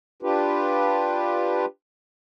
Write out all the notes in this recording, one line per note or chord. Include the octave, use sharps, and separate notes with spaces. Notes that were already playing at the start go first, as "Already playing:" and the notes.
D4 F4 G4 B4